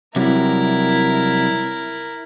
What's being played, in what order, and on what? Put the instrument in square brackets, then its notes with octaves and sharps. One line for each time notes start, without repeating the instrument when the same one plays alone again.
[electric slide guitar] C3 F#3 G3 [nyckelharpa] E4 A#4